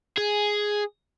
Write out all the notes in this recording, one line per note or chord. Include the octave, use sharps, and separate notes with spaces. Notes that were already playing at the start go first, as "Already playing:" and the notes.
G#4